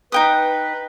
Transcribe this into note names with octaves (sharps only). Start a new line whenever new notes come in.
D#4 B4 G5 D#6